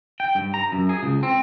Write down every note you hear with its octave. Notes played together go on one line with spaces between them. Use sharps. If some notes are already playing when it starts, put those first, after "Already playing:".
G5
G2
A#5
F#2
G#4
C#2
C4